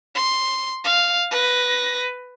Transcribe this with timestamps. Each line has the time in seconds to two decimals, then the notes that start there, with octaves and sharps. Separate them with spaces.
0.15 C6
0.85 F5
1.31 B4 A#6